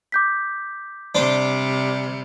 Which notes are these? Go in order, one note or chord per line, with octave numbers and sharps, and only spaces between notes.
D6 G6 B6
C3 G3 D4 C5